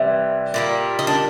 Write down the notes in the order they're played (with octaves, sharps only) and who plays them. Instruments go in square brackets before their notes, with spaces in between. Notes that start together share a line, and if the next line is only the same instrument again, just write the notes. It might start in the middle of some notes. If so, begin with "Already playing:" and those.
Already playing: [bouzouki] C3 E3 G3
A#2 G3 A#3
D#4
D4